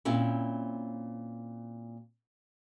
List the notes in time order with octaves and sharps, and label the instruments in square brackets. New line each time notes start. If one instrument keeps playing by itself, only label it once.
[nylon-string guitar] A#2 C4 C#4 E4